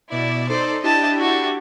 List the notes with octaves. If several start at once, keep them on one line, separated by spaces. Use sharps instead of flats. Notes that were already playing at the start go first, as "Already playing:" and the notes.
B2 E4 D5
D#4 A4 C5 D5
D4 E4 G4 D#5 A5
F#4 A4